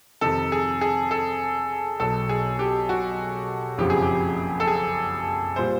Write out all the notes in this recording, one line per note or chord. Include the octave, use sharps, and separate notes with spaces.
F2 C3 D#3 A4
G#4
G#4
A4
B1 B2 F#3 A4
G#4
G4
F#4
F#1 F2 C#3 F3 G4
G#4
G4
A4
G#4
A#2 G3 C5